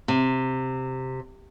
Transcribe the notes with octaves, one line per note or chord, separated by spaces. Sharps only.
C3